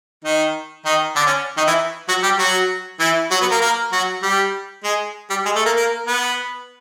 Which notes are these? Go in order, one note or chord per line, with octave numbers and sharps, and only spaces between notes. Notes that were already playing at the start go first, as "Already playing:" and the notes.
D#3 D#4
D#3 D#4
D3 D4
C#4
D#3 D#4
E3 E4
F#3 F#4
G3 G4
F#3 F#4
E3 E4
F#3 F#4
B3 B4
A#3 A#4
A#3 A#4
F#3 F#4
G3 G4
G#3 G#4
G3 G4
G#3 G#4
A3 A4
A#3 A#4
A#3 A#4
B3 B4